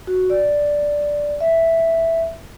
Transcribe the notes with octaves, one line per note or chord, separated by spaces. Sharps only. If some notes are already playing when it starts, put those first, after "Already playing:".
F#4
D5
E5